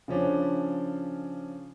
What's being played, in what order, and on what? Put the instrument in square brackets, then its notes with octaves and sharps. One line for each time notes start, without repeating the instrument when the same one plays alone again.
[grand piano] C#3 F3 C#4 D4